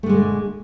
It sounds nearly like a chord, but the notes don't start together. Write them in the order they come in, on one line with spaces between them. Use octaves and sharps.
A3 D3 G#3 A#2